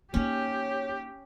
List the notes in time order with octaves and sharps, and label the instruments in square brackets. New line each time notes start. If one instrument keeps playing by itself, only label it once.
[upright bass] A#3 D#4 [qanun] C#4 [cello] G4 [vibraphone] C#5